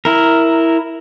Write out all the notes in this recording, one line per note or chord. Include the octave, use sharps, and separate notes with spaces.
E4 A#4